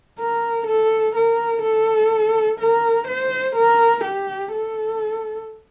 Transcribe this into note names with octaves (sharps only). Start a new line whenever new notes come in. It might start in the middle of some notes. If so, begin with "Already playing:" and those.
A#4
A4
A#4
A4
A#4
C5
A#4
G4
A4